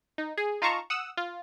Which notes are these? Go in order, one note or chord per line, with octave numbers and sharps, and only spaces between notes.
D#4
G#4
D#4 F4 F5 A5 A#5 C#6
F#5 D#6 E6
F4